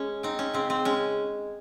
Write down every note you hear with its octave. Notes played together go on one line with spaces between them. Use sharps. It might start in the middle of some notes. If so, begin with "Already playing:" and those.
Already playing: G#3 C#4
C4 D#4
C#4
C#3 C4
C4
G#3 C#4